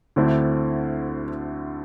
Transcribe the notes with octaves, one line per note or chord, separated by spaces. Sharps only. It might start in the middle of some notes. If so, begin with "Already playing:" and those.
D2 D3 A3 C4 E4